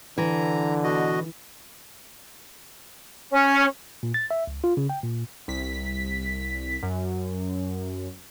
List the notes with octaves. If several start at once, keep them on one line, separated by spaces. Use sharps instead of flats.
D3 E3 A#5
B2 F#4 D#5
C#4
A#2
A6
E5
C#2
F4
C#3
G5
A#2
C2 B6
F#2